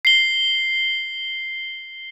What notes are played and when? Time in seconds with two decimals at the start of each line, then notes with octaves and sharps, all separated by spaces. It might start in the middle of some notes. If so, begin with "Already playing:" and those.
0.05 C7 G7